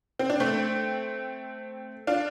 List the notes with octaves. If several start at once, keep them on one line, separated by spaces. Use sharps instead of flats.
C4
D4
A3 C4
D4 F4